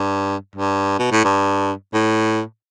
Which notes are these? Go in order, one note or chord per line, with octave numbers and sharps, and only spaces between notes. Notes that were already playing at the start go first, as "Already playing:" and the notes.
Already playing: G2
G2
B2
A2
G2
A2